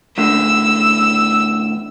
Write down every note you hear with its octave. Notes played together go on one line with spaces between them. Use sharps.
E2 A2 D3 E6